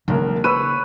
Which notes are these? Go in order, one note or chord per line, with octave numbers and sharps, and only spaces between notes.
E1 B1 C#3 A#3 A#4
B4 C#5 B5 E6 D#7